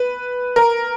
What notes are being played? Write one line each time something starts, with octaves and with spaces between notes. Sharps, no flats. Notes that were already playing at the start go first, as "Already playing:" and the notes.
Already playing: B4
A#4